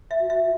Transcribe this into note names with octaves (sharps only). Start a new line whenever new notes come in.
E5
F#4
E5